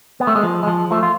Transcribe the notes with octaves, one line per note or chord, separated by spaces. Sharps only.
B3
A3
G#3
F3
G#3
F3
F3 A3
F4